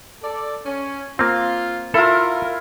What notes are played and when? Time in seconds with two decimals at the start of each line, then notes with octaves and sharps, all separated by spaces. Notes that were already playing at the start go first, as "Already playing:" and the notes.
0.22 A4 D5
0.65 C#4
1.19 A#3 C4 F4
1.94 E4 F4 A4 A#4